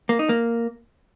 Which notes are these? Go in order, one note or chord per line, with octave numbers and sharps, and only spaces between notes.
A#3
D#4
A#3